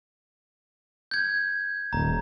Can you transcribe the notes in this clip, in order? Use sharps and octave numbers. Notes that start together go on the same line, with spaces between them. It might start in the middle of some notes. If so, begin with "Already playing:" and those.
G6 G#6
D#1 A#5